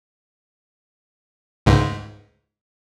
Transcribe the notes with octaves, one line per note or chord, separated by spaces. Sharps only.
C#2 G#2